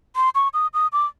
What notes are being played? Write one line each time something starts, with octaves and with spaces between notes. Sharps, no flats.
C6
C#6
D#6
D#6
D6